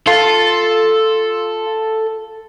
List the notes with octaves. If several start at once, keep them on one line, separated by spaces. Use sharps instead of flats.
F4 A4